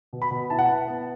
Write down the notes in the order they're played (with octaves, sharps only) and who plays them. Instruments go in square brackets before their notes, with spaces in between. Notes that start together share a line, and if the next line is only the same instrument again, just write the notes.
[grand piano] B2
B5
B2
E4 A5
F#5
B3 A5
B3